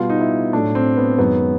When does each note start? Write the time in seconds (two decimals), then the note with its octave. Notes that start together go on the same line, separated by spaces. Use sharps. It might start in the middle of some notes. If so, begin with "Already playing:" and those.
Already playing: B2 G3 B3 F4
0.10 D#4
0.21 E4
0.53 A2 F#3 A3 D4
0.75 C4
0.97 B3
1.18 F#2 D#3 G#3 B3